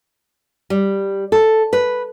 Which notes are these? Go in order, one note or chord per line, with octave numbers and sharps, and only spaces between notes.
G3
A4
B4